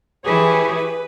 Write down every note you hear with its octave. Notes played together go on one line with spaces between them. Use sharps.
E3 E4 G4 G#4 B4 C#5
B4